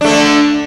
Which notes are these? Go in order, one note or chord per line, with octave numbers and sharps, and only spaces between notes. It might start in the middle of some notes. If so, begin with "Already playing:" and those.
D3 A3 D4